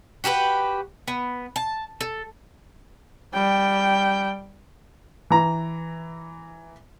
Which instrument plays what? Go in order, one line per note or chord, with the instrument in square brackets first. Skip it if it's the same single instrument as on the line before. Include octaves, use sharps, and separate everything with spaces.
[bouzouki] F#4 G4 A4 B4
B3
A5
A4
[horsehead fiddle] G3 G5
[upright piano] E3 A#5